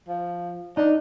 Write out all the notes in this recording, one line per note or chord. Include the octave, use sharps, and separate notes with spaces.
F3
D4 D#4